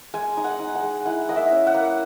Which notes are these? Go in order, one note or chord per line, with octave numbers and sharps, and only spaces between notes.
G#3 G#5
D#4
F#5
D#4
F#5
G#3
E4 F#5
A#3 D#5
E5
C#4
F#5
A#3